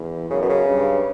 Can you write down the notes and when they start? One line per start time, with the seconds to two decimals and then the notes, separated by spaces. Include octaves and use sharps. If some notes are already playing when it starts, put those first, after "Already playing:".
Already playing: E2
0.30 F#2 C#3
0.42 B2
0.49 C#3
0.67 G2